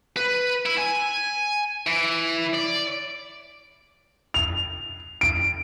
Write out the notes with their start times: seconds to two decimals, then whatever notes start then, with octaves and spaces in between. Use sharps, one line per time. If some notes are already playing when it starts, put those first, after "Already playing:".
0.16 B4
0.65 E4
0.78 G#5
1.87 E3
2.53 D5
4.34 F7
5.21 D7